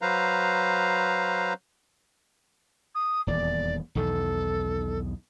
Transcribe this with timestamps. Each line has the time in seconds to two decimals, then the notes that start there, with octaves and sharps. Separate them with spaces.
0.02 F#3 B4 C5 F5 A#5
2.94 D#6
3.27 D#1 E2 D5
3.95 B1 E2 D#3 A4